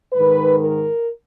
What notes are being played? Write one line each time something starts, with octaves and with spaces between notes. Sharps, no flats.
G#2 D#3 B4
A#4